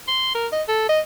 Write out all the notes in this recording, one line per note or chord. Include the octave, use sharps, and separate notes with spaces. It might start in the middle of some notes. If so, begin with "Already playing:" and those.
C6
A#4
D#5
A4
D#5